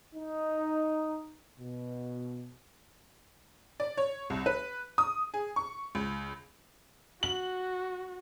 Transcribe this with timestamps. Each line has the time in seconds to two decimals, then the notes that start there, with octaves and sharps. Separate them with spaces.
0.15 D#4
1.59 B2
3.80 D5
3.97 C#5
4.30 C2
4.46 B4
4.98 D#6
5.34 G#4
5.56 C#6
5.95 C#2
7.23 F#4 F#7